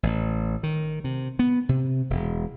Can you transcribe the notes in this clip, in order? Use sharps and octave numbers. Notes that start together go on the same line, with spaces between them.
A1
D#3
C3
B3
C3
E1